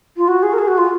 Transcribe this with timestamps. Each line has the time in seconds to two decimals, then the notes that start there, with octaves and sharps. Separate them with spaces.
0.17 F4
0.28 F#4
0.43 G#4
0.53 A#4
0.58 G#4
0.68 F#4
0.78 F4